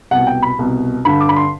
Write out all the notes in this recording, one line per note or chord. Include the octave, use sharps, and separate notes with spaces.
C2 B2 F#5
G5
B5
C2 B2
G2 D3 B5
D6
B5
C6